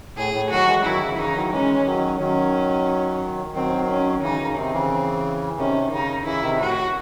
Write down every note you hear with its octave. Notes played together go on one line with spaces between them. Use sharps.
A2 G#4
A2
D#3 F#3 F#4
E3 G#3
D#3 F#3 E4
C#3 E3
C#3 E3 D#4
D#3 F#3
E3 G#3 C#4
D#3 F#3
D#3 F#3 C#4
D#3 F#3 C4
C#4
C#3 E3 D#4
C#3
C3 D#3 C4
C#3 E3
C3 D#3 C#4
C#3 D#4
C#3 E3 E4
C3 D#3
A2 F#4